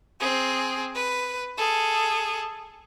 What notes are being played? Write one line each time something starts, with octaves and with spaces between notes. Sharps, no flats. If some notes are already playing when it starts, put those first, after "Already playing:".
C4 G#4
B4
G#4 A4